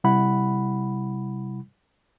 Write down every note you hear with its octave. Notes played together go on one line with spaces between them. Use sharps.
C3 G3 E4 F#5 B5